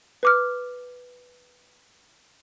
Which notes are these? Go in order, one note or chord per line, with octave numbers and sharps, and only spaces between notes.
B4 D6 F6